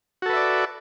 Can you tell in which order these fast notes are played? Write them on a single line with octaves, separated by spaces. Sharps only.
F#4 A4 B4 E5 D5